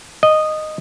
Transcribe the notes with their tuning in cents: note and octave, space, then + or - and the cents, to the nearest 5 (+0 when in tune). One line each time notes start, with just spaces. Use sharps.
D#5 -10